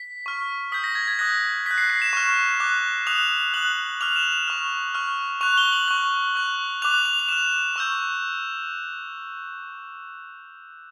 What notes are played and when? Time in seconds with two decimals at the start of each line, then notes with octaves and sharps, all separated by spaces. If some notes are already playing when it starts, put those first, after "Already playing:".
Already playing: B6
0.26 C#6 F6
0.72 D#6 G6 B6
0.84 A#6
0.95 G#6
1.07 G#6
1.19 D#6 F#6 A#6
1.66 D#6 F#6 B6
1.78 C7
1.90 C7
2.02 E7
2.13 C#6 F6
2.60 D6 F#6
3.07 D#6 F#6 F7
3.54 D#6 F#6 F#7
4.01 D6 F6 F7
4.16 E7
4.32 F7
4.48 C#6 F6
4.95 C#6 F6
5.41 C#6 F#6 F7
5.58 G7
5.72 F#7
5.88 C#6 F#6
6.35 C#6 F#6
6.82 D6 F#6 F7
7.05 F7
7.19 F7
7.29 D6 F6 E7
7.76 C#6 E6 G6